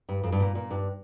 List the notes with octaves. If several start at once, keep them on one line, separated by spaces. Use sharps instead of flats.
G2
F2
G2
A#2
A#2
G2